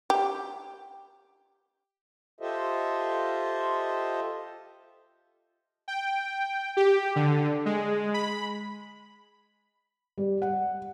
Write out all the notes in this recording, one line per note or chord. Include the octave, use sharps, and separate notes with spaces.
G4
F4 G4 A4 C5 D#5 E5
G5
G4
D3
G#3
B5
G3
F#5